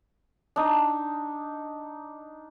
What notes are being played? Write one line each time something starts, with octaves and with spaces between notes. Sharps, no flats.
D4 D#4